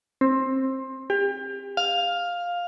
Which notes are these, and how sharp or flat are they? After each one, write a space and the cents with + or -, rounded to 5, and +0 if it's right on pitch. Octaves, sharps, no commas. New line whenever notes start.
C4 +20
G4 +35
F5 +10